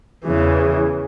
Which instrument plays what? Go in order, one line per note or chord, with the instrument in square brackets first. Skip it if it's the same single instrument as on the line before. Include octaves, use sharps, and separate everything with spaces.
[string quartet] E2 C#3 E3